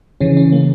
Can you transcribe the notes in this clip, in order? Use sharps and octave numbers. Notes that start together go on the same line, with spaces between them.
C#3 E3 C#4
C#4
A#3